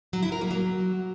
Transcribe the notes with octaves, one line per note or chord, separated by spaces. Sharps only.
F#3
E4
A#4
A#3
F#3